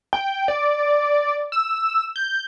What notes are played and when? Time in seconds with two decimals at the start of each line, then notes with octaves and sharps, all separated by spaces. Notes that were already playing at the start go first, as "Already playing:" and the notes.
0.13 G5
0.48 D5
1.52 E6
2.16 G6